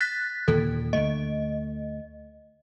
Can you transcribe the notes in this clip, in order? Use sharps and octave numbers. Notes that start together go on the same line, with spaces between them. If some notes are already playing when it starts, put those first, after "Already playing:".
F#6 A6 B6
D#2 A#2 D3 A4
D2 D3 A3 D#5